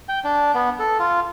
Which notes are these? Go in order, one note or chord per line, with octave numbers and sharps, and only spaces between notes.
G5
D4
B3
A4
F4